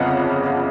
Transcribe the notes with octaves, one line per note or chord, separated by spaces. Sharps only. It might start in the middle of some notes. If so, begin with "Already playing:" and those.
Already playing: G1 F2 C#3 D#5 F5 F#5